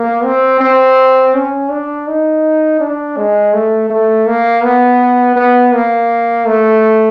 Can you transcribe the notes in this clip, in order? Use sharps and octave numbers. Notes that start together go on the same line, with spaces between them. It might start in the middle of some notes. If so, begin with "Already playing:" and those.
Already playing: A#3
C4
C4
C#4
D4
D#4
D4
G#3
A3
A3
A#3
B3
B3
A#3
A3